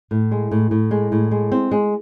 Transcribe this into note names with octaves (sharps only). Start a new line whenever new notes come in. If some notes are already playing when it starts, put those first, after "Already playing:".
A2
G#3
A2
A2
G#3
A2
G#3
C4
G#3